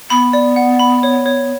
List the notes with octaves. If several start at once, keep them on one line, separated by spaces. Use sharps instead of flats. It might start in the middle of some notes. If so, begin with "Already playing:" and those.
B3 B5
D5
F#5
B5
C#5
C#5